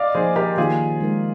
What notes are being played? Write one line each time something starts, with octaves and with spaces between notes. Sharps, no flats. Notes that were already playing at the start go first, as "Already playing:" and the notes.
Already playing: D5 D#5 F5
F3 A#3 D#4 G#4 C5
G4 A#4
D#3 A#3 D#4 F4 G#4
G#3 D#4 A#4